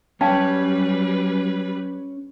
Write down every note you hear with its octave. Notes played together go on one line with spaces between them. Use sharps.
F#3 G3 C#4 B4 F5 G5 A5